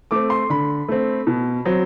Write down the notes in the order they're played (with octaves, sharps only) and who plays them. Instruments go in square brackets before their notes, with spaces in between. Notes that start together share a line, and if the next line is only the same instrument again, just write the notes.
[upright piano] A3 C4 D6
C6
D3 B5
A3 C4
B2
F#3 C4